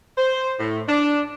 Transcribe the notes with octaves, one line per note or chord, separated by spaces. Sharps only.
C5
A2
D4